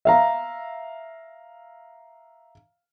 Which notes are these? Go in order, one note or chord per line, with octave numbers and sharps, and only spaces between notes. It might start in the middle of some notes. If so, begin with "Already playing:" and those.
E5 F5 A#5